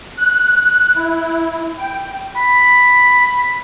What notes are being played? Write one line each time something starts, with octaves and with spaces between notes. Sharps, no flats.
F#6
E4
G5
B5